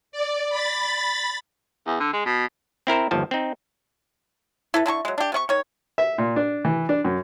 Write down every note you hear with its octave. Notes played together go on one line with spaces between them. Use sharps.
D5
B5 A6
E2
D3
G#3
B2
C4 E4 A#4 C5
G1 D#2 F3 A5
C4 D#4
E4 A4 B4
D3 E4 A5 C#6
F#3 G#3
D4 G4
C3 C#4 C#6
D#3 C#5
E5
A#2
D4
E3
D4
F#2